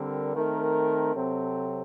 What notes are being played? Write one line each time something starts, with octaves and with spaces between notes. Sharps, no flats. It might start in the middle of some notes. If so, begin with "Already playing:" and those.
Already playing: D3 G3 C4 A#4
D#3 A3 C4 A#4
C3 F#3 C4 A4